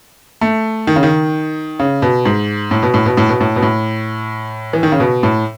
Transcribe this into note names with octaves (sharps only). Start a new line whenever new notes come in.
A3
D#3
C#3
D#3
C#3
B2
G#2
A2
B2
A2
B2
A2
B2
A2
B2
A2
E3
D#3
C#3
B2
A2